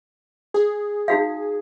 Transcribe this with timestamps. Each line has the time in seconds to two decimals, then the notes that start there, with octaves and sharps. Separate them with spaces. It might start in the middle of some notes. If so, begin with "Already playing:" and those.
0.54 G#4
1.08 D#4 F#4 F5